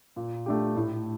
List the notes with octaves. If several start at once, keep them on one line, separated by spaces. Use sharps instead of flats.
A#2
A3 D4 G4
A2